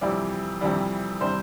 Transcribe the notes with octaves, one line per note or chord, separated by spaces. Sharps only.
F2 C3 E3 G3 D5
F2 C3 E3 G3
C3 E3 G3 C5